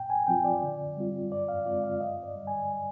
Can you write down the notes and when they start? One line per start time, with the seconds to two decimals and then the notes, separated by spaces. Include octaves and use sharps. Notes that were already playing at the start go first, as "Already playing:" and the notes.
Already playing: A#2 G5
0.10 G#5
0.27 F3 C4 F4 G5
0.44 D5
0.62 D3
0.97 G3 C4 F4
1.31 G2 D5
1.48 F5
1.66 D3 G#3 C4 F4 D5
1.84 F5
2.00 G2 D#5
2.23 D5
2.35 D3 G3
2.47 G#5